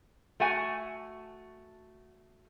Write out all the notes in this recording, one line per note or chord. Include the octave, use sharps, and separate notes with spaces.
A3 F#4 F#5 G#5